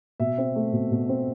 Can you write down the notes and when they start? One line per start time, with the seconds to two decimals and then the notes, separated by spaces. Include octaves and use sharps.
0.20 B2 E5
0.38 C4
0.56 A3
0.73 B2
0.91 B2
1.09 C4